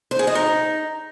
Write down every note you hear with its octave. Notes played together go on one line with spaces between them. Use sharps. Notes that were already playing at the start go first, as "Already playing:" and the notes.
C5
G#4
D#5
D#4